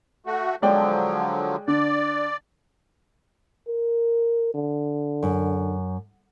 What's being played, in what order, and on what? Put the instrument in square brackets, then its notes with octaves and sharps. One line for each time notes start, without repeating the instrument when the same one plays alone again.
[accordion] A3 F#4
[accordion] D3 F3 F#3 [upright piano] G#3 D5 G5
[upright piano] D3 [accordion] D5
[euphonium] A#4
D3
[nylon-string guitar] F#2